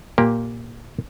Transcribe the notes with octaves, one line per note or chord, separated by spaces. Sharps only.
A#2 A#3 G4